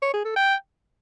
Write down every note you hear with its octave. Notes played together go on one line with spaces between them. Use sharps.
C#5
G#4
A4
G5